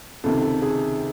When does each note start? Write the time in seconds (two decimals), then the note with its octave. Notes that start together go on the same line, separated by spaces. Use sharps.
0.24 C#2 C3 D#3 A4
0.42 A4
0.62 G#4